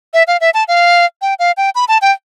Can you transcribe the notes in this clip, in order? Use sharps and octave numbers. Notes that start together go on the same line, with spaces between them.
E5
F5
E5
A5
F5
G5
F5
G5
B5
A5
G5